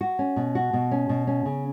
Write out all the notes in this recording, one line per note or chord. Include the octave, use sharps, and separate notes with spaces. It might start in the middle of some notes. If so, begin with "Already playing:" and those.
F#4
C#4
B2
F#4
B2
C#4
B2
C#4
C#3